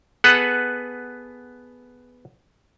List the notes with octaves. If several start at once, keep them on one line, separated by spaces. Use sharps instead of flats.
B3 G#4 A4 B4 F#5